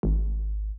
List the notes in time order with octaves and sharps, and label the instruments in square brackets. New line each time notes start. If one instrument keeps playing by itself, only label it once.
[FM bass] G#1